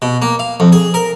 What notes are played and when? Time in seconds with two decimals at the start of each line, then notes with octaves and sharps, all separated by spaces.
0.02 B2
0.22 A#3
0.39 F5
0.60 F2
0.72 G#4
0.94 A#4